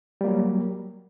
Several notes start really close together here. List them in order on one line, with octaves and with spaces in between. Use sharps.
G3 A#3 F#3